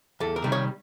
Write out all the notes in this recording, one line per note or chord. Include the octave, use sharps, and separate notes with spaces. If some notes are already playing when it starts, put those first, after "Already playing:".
E2 A4
A#4
C3 D#3 G3
C#5